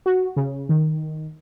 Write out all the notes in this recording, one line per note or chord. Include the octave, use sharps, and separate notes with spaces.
F#4
C#3
D#3